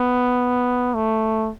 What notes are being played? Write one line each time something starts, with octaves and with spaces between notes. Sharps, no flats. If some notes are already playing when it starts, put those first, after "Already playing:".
Already playing: B3
A3